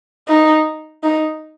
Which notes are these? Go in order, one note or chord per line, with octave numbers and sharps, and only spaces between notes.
D#4
D#4